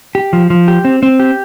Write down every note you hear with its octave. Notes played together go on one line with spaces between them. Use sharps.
G4
F3
F3
G4
C4
C4
G4